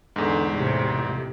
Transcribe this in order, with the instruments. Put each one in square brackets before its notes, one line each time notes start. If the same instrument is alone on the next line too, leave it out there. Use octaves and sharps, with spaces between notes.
[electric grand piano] E2 G#2 [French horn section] D3 A4
[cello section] A2 C3 [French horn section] G#3 G4
[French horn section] F2 A#3 G4